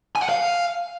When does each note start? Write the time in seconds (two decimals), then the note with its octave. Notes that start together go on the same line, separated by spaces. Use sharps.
0.16 G#5
0.22 F#5
0.29 F5